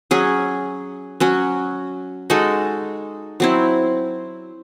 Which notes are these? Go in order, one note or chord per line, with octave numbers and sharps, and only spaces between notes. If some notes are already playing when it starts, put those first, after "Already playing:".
F#3 C#4 G#4
F#3 C#4 F#4
G#3 D#4 F#4 A4
F#3 C4 E4